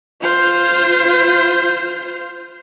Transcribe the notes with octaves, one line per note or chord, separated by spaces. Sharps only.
F4 C5